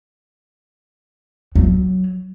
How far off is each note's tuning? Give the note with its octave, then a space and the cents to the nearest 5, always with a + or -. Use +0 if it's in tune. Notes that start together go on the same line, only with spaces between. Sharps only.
F#3 +5